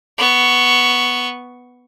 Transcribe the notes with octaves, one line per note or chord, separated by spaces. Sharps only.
B3 C#6